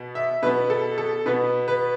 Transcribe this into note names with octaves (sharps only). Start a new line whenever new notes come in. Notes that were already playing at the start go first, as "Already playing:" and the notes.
Already playing: B2 B3
E5
B2 B3 B4
A4
A4
B2 B3 B4
B4